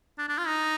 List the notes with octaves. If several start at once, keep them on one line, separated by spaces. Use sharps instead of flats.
D4
D4
F4
D#4